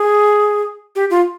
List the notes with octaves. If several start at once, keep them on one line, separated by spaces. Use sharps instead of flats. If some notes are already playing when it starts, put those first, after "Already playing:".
Already playing: G#4
G4
F4